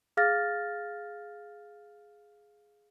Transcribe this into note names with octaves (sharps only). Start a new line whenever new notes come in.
G#4 F5 F6 A6 A#6